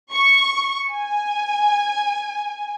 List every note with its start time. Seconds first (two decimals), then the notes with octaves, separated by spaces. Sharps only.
0.13 C#6
0.92 G#5